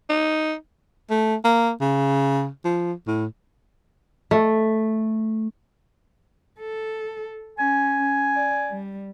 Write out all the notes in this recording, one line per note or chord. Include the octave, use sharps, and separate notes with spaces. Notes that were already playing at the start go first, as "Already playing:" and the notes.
D#4
A3
A#3
C#3
F3
A2
A3
A4
C#4 G#5
C#4
D5
G3